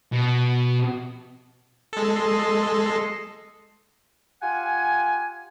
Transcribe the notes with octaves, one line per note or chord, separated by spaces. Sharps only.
B2
G#3 A4
D#5 C6
F4 G4 F#5 G#5